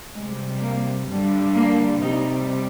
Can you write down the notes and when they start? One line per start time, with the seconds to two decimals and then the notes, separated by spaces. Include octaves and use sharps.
0.15 C3 G3 G#3
0.61 A#3
1.09 G2 D3 G3
1.55 A#3
2.02 C3 G3 D#4